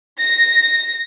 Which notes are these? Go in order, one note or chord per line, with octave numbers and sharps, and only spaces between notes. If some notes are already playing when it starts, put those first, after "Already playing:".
A#6